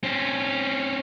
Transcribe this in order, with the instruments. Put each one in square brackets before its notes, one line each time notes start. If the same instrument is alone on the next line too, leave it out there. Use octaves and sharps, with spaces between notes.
[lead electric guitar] C4 C#4